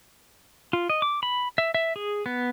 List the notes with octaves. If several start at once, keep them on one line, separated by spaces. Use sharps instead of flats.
F4
D#5
D6
B5
E5
E5
G#4
B3